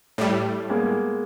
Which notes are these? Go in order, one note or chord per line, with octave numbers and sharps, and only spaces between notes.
A2 G3
G#3 A#3 B3